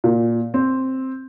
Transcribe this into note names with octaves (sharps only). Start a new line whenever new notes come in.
A#2
C4